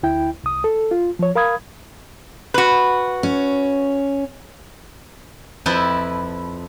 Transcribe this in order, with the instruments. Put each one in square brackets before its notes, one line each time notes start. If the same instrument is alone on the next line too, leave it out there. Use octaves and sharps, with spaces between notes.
[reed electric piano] D2 E4 G5
C2 D#6
A4
F4
F3 C#5
A#4 F5 B5 D#6 G#6
[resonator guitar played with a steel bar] F#4 B4
[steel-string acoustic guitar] C#4
[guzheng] F2 E4 B4 E5 G5 A5